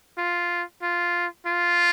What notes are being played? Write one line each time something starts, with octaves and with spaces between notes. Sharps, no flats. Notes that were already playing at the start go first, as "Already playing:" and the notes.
F4
F4
F4